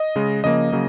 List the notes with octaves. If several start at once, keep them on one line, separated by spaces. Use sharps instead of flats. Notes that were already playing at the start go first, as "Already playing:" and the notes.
Already playing: D#5
C#3 G#3
C#3 F3 A#3 D#5
C#3 F#3 A#3